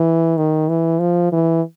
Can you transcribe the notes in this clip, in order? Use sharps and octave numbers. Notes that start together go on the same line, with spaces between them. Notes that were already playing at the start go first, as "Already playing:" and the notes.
Already playing: E3
D#3
E3
F3
E3